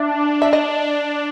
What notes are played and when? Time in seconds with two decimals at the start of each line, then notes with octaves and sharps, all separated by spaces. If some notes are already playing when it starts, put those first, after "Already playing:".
Already playing: D4 E5
0.42 E5
0.53 D#5